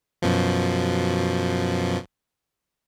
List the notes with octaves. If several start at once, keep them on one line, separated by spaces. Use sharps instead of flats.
F#2 B2 F3